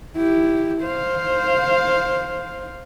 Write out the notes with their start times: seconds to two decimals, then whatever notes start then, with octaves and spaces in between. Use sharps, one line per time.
0.16 E4 G4
0.82 C5 F5